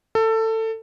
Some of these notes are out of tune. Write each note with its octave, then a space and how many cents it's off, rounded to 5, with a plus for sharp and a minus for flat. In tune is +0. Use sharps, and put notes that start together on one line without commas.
A4 +20